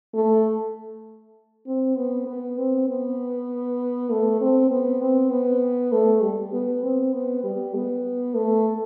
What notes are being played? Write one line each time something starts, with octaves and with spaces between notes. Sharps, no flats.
A3
C4
B3
B3
C4
B3
A3
C4
B3
C4
B3
A3
G3
B3
C4
B3
G3
B3
A3